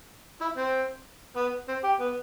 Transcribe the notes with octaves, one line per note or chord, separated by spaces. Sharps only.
E4
C4
B3
C4
G4
B3